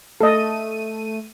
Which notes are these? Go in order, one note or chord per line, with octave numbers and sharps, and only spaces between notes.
A3 A4 D#5 D#7